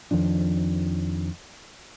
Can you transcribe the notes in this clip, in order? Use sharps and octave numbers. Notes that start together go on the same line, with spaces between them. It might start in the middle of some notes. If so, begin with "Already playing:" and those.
F2 D#3 F3 D4